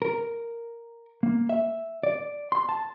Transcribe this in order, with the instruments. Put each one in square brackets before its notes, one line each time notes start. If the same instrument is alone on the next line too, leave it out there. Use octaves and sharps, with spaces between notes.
[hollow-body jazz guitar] A#4
A#3
E5
D5
C6
A5